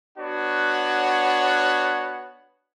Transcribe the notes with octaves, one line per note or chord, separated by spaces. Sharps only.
B3 D4 F#4 C#5 F#5